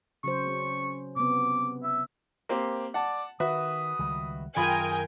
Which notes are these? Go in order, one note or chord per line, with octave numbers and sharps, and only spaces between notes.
C#3 F#3 C5 C#6
C#4
C3 B3 D6
E5
A#3 C4 G4
D5 F#5 A5
D#3 F#4 B4 E5 D#6
C#2 D#3 G3
F#2 D#3 F4 G#4 A#4 G5 G#5 B5